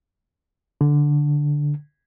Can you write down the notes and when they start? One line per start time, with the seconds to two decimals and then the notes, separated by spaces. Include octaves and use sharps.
0.81 D3